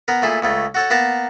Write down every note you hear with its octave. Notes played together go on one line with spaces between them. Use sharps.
B3 A#4
A#2 A3 E4 G#4
C#2 C#3 A3
F#4 A4 C#5
A#3 B3 A#4 A5 A#5